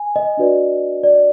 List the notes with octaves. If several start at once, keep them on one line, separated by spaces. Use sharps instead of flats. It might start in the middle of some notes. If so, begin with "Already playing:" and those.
Already playing: G#5
D#5
D4 F#4 B4 D5
D5